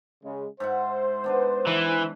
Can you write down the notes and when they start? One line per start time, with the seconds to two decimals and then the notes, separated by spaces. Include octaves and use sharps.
0.24 C#3 G#3
0.60 G#2 C5 E5 F#5
1.24 B3 D4 B4
1.67 E3